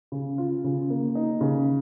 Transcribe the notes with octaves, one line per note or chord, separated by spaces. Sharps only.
C#3
F4
C#3
A#3
D#4
C#3